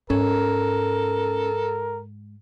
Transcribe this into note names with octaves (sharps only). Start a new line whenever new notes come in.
G#2 C#4 A4 A#4